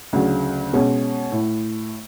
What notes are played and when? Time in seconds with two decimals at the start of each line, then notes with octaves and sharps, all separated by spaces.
0.13 D2 C#3 F#3
0.73 B2 G#3 C#4
1.32 A2